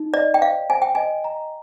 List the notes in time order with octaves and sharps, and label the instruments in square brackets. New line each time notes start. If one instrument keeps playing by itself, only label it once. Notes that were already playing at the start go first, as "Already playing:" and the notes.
Already playing: [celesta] D#4
[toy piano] D5 [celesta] D#5
[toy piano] G5
[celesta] C5 [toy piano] F5
[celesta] C5 [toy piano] G#5
[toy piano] G5
[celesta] D#5 [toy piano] G#5
[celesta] A#5